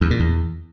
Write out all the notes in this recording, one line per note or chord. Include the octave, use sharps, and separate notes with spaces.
E2
A#2
E2